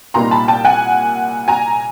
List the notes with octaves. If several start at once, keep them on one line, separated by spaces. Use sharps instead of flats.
C2 A#2 G3 A#3 D#4 A#5 C6
A5 B5
G5 A5
F#5 G#5
G#5 A#5